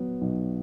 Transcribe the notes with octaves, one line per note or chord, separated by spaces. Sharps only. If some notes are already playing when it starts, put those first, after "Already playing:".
Already playing: F#3 B3
B1